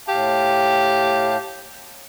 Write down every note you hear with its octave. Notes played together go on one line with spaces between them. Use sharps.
A2 G4 F5 A5